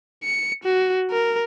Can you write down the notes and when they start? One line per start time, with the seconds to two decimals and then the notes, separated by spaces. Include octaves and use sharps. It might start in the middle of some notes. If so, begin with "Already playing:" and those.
0.24 C#7
0.64 F#4
1.11 A#4